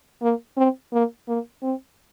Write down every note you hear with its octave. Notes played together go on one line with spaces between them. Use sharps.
A#3
C4
A#3
A#3
C4